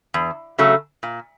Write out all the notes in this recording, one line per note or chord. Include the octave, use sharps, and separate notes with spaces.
E2
C#3 F#3 A3
A#2